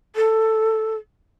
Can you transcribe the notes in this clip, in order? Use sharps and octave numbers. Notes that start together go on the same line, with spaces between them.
A4